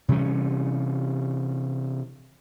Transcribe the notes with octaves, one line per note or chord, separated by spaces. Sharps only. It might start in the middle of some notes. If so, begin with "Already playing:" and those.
C3 E3 G3 C#4